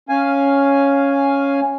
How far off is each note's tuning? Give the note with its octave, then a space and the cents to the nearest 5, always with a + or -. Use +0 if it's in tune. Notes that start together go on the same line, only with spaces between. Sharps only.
C#4 +0 F5 +0 G#5 +0